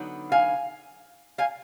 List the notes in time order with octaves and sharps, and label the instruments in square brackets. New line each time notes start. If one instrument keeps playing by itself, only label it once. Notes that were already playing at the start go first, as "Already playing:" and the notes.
Already playing: [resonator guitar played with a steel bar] D3 F#3 B3 D#4
F5 G#5
F5 G#5